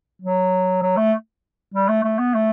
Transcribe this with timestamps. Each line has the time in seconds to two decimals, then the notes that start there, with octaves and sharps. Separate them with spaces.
0.22 F#3
0.82 F#3
0.97 A3
1.74 G3
1.88 A3
2.04 A3
2.19 B3
2.34 A3